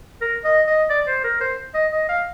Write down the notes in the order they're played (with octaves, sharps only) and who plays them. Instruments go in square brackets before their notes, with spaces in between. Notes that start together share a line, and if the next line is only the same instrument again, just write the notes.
[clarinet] A#4
D#5
D#5
D5
C5
A#4
C5
D#5
D#5
F5